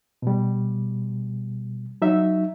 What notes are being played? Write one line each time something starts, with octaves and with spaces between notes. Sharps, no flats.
B2 G3
F#3 D#4 E5